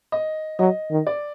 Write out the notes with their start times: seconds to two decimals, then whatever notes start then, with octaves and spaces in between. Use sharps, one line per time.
0.12 D#5
0.59 F#3 D#5
0.91 D#3
1.07 D5